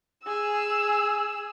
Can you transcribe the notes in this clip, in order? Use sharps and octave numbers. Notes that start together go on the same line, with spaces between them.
G#4 E6